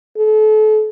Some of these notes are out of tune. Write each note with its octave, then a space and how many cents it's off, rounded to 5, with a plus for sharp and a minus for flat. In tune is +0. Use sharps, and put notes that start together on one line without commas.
A4 -35